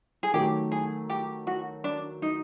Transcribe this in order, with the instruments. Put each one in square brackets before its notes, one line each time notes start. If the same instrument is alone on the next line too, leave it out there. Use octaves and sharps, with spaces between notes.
[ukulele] G#4
[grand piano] D#3 F#3 A3 [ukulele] G4
[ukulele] G#4
G4
F#4
D4
D#4